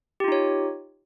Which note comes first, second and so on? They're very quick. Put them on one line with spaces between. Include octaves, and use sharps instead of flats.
G4 F4 D#4 C#5